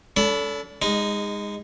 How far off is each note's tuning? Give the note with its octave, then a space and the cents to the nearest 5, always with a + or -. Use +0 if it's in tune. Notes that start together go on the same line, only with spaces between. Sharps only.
D4 -45 A4 +0 B5 +0
G#3 -25 D#4 +0